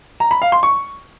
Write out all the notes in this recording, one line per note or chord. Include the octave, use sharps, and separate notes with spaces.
A#5
B5
F5
C6
C#6